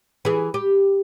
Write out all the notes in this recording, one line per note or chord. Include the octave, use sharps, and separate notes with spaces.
E3 G#4
G4